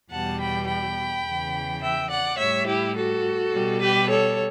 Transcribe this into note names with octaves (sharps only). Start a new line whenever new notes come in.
E2 B2 G3 F#5 A5
G5 B5
G5 B5
E2 C#3 E3
E5 G5
D5 F#5
A2 G3 C#5 E5
E4 G4
F#4 A4
B2 G3
G4 B4
A4 C#5